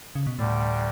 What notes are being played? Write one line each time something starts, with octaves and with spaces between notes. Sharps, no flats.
C#3
B2
D2 A2 D3 G3